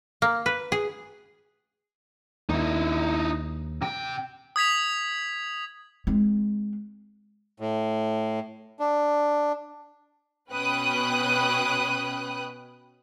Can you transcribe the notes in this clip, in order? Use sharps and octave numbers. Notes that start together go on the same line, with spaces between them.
A#3
B4
G#4
D#2 D#4 E4
C3 G5
D#6 G#6 B6 F7
G#3 C4
A2
D4
B2 C#4 B4 G5 D#6 F#6